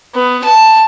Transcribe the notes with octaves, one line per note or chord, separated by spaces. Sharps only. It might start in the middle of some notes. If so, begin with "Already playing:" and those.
B3
A5